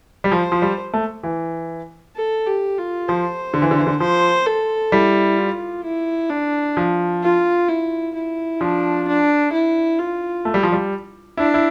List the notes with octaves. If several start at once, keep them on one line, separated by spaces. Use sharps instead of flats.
G3
F3 C5
F3
G3
A3
E3
A4
G4
F4
F3 C5
D3
E3
D3
E3
D3
F3 C5
A4
G3 E4
F4
E4
D4
F3
F4
E4
E4
F3 D4
D4
E4
F4
A3
G3
F3
G3
D4 E4
E4